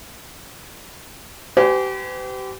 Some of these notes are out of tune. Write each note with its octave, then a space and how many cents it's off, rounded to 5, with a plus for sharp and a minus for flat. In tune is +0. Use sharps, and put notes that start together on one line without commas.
G4 -30 B4 +45 G#5 +0